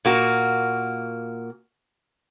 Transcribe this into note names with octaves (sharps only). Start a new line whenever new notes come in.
A#2 A#3 F#4